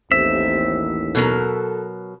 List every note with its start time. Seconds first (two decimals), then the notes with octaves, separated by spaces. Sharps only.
0.12 A1 D#2 C4 E5
1.15 B2 F#3 A4 A#4